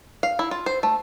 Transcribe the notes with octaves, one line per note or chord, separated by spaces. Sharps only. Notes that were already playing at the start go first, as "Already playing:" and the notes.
F5
E4
F4
C5
A3